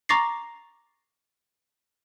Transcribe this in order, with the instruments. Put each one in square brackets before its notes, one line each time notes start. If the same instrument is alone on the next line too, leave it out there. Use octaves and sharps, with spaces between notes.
[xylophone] A#5 C#6 D6 A6 A#6 C7